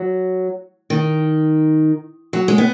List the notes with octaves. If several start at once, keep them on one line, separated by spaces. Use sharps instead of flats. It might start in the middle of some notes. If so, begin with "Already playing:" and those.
Already playing: F#3
D#3
F#3
G#3
B3